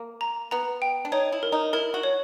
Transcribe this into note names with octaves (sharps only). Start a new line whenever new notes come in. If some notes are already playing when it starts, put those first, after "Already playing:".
Already playing: A#3
A#5
B3 A#5
G5
D4
D#4 C#5
E4
A#4
D#4
E4 A#4
F#4
C#5